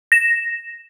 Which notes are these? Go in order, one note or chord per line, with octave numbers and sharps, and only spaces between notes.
A#6 E7